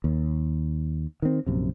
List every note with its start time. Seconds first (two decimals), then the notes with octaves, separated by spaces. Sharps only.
0.04 D#2
1.22 D#3 C4
1.46 A#1 F#2 C3